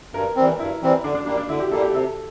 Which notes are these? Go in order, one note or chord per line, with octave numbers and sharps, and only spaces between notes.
G2 A#4
E3 G3 C4
G2 E4
E3 G3 C4
D3 D4
D4
G3 A#3 D4
D4
D3 E4
G4
G3 A#3 A4
G4
C3 A4